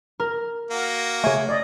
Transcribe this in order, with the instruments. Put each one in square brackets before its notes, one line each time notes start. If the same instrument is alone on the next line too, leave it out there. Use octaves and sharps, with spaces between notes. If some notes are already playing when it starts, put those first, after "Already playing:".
[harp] A#4
[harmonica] A#3 F#4
[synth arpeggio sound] C#3 A3 [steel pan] C#5 G#5
[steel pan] D5 D#5